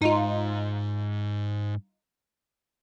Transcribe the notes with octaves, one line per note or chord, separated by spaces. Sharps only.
G#2 D#4 F4